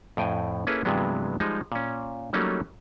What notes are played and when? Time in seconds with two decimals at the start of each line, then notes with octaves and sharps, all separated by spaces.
0.17 F2 A2 G5 G#5
0.67 A#3 C#4 E4 G#4 A4 B4
0.85 G2 C3 E3 F#3 G#3 B3
1.40 F3 G3 G#3 D#4
1.72 A#2 C#4
2.33 F#3 G3 A3 A#3 C#4 D#4